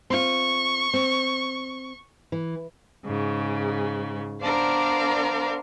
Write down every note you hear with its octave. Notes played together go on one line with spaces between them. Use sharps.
C4 F4 C#6
C4
E3
G#2 C#3
B3 D4 A#4 C5 D5 F5